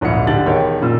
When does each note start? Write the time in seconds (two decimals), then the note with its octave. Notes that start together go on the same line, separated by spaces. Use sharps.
0.01 D1 A#1 G#2 E4 C#7
0.27 G#2 D3 G4 A6 F#7
0.46 E1 D#3 C#5 G5
0.81 F#2 A#2 E6